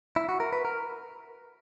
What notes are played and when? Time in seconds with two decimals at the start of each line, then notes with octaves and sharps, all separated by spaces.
0.16 E4
0.29 F#4
0.40 A#4
0.53 B4
0.65 A#4